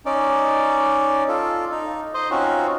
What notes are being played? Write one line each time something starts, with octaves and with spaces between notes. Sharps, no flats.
C#4 D#4 D5
F4 A4
D#4
C5 D#5
C4 C#4 D#4 F4 F#4